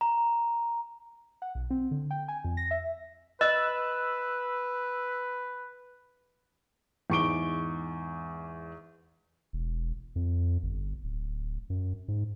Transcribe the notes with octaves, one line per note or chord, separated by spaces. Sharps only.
A#5
F#5
B1
C4
D3
G5
G#5
F2
A#6
E5
B4 D#5 E6 F#6
E2 G#2 C#6 D6 D7 G7
E1
F2
G1
D1
F#2
G#2